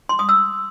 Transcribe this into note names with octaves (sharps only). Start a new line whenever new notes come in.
C6
D#6
E6